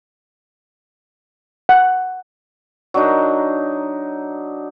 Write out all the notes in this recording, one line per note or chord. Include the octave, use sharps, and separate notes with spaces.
F#5
F#3 D4 D#4